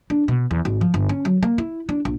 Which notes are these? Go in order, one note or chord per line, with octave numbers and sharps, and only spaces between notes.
D4
B2
E2
G#1
F3
G1
C#4
F#3
A#3
E4
D4
A#1